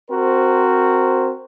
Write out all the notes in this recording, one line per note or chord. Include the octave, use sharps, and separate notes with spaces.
C4 F#4 A#4 C5